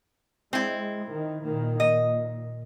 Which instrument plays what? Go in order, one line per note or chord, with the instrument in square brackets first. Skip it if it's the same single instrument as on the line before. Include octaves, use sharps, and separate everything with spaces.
[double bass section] G#3 [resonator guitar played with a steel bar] C4 E4
[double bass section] D#3
A#2 D#3 A#3
[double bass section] A#2 [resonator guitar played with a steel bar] D#5